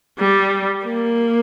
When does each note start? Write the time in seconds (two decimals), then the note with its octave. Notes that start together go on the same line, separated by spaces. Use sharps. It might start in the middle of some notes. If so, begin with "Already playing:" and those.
0.19 G3
0.86 A#3